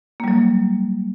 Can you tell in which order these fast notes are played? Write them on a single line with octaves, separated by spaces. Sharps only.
A#3 G3 F#3